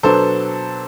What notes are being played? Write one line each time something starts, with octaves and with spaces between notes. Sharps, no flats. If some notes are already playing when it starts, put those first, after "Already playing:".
B2 F#3 B3 D4 A4 C5